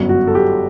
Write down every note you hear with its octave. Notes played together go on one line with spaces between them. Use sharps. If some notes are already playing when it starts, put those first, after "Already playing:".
Already playing: G1 F#2 F#3
F#4
A4
G4